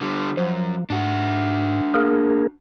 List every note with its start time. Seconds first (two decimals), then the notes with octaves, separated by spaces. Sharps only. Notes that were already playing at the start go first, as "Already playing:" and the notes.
0.01 D3 G3
0.37 F#2 F3
0.90 G#2 D4 F#4
1.94 A#3 G#4 A#4